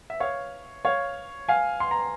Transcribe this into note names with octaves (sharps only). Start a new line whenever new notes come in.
E5
C#5 F5
C#5 F5
F5 G#5
C6
A#5